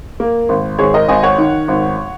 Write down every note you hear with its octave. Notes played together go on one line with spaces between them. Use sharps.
A#3
G#1
G#1 G#4 C#5
A#4 D#5
G#1 D#5 G#5
C#5 F#5
D#3
G#1